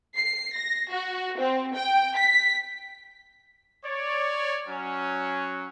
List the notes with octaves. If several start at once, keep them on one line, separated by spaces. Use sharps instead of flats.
C7
A#6
F#4
C4
G5
B6
C#5 D5
F#3 C#4